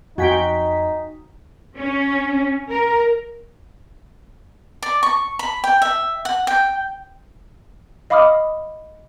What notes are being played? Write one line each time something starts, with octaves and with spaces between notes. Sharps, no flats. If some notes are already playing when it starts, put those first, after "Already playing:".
F2 D#4 F#4 G5 G#5 B6
C#4
A#4
D5
C#6
B5
G5
E5
F#5
G5
D#5 F5 B5 D6 D#6 F6